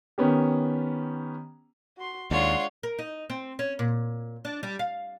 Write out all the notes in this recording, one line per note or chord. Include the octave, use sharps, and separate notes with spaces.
D#3 B3 C#4 G4
F#4 C6
D#2 G#3 D4 F4 C#5 F#5 C6
A#4
D#4
C4
C#4
A#2
D4
G3
F5